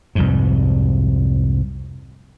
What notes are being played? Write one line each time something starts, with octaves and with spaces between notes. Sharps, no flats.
C2 F2 G#2